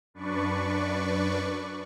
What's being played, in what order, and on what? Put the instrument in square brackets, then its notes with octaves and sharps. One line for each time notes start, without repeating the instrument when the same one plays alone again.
[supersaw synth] F#2 D4 B4 D5 C#6